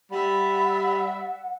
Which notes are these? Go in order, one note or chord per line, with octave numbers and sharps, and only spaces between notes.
G3 D5 E5 F#5 B5